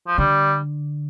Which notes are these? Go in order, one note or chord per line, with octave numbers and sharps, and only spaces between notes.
F3
D3 G3